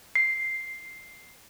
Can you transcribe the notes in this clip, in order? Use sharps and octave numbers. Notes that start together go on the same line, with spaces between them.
C7